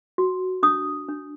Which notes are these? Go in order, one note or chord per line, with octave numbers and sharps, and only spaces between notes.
F#4
D4 D#6
D4